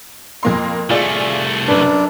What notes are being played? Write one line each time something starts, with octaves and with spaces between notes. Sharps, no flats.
F2 A#3 C6
C2 A3 F4 G#4 D5
F#2 D4 B4